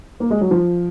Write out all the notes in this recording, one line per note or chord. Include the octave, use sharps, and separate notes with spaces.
A#3
G#3
F#3
F3